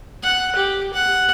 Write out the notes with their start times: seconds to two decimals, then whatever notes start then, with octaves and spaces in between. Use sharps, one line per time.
0.23 F#5
0.55 G4
0.93 F#5